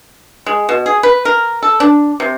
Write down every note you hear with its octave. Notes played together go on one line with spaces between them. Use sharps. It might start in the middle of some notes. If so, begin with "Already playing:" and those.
G#3
B2
G#4
B4
A#4
A4
D4
C3